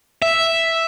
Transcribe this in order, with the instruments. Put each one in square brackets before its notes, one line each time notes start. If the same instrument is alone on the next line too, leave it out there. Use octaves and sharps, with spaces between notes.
[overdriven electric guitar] E5